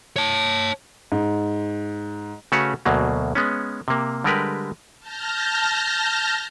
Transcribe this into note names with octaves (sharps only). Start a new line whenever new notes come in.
C#5 A5
G#2
C#3 A3 C#4 F#4 B4 C#5
D2 B2 F#3 A#3
G#3 B3 C#4
C3 A#3
D3 G3 G#3 G4 A#4 B4
A5 F6 G6 A#6